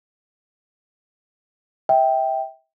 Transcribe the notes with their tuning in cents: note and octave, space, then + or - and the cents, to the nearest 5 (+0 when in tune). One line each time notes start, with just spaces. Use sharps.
E5 -30 G5 +0